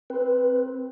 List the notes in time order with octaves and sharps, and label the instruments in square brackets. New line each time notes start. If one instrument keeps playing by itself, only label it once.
[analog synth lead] C4 [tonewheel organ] B4